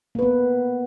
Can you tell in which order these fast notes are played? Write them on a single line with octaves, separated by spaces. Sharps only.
A#3 B4 B3